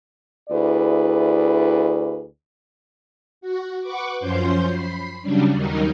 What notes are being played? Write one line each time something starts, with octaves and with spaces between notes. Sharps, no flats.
D2 E4 G#4 B4 D5
F#4
B4 F#5 C#6 D6
F#2 F3 C#4 C5 C6 G6
B5 C7
C#3 F#3 G3 C#4 D4
D#2 F#3 G3 D#4 A#4